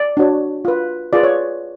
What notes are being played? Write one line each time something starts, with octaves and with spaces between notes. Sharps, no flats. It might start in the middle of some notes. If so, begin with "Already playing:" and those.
Already playing: D5
D4 F#4 C#5
F4 B4
F4 G#4 B4 D5
C#5